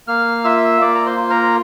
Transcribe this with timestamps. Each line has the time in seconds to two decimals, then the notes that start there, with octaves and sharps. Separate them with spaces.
0.08 A#3 F5 F6
0.44 F4 E5 E6
0.81 A#3 D5 D6
0.95 A#5
1.06 C5 C6
1.17 F4
1.30 A#4 A#5